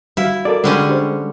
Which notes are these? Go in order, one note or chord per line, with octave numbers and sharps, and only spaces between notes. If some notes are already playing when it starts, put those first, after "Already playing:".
G3 E4 F#4 F5
F#4 A4 A#4 D5
D3 G3 G#3 C#4
D4 G4 C5